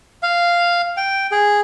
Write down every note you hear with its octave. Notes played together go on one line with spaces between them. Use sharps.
F5
G5
G#4